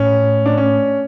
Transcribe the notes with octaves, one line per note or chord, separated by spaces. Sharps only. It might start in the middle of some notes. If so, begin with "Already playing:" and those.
Already playing: A2 C#4
D4
C#4